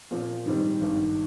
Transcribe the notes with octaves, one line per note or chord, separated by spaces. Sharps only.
A#2 F3 C4
G#2 D#3 G3 C4
G#1 G2 D#3